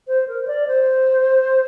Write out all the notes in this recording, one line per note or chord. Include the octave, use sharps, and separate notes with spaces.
C5
A#4
C5
D5
C5